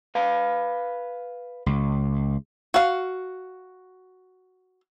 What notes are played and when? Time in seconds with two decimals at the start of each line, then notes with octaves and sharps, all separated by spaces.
0.15 B4 F5
1.66 C#2
2.74 F#4 F5